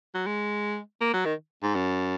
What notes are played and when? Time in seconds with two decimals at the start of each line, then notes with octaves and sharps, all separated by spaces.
0.14 F#3
0.26 G#3
1.01 A#3
1.13 F#3
1.25 D#3
1.63 G#2
1.75 F#2